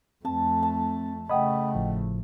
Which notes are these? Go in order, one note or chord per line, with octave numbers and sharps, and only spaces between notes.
F2 A3 C4 A5
A5
C#3 A3 D#5 F#5 G5 B5 D#6
G#1 A2 F3